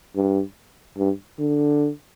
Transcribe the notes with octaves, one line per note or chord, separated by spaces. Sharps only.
G2
G2
D3